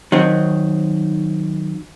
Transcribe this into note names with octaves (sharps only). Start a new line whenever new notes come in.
D#3 F#3 C4